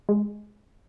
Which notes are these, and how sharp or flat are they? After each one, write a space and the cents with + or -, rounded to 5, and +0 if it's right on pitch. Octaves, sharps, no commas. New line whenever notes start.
G#3 +5